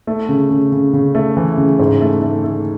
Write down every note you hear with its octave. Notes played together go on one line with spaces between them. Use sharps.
A3
C#3
C#3
C#3
C#3
A3
E3
C#3
G#2
A3
A3
A3